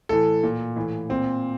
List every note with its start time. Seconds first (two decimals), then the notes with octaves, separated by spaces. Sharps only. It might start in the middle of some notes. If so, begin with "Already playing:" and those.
0.09 A2 E3 A4
0.43 A#2
0.76 A2 E3
1.09 A#2 C4